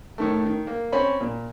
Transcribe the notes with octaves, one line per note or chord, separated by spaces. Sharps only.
A2 D#3 A3
D#3
A#3
C4 C#4 B5
A#2